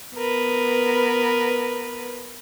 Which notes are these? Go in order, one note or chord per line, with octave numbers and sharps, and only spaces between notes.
B3 A#4 B4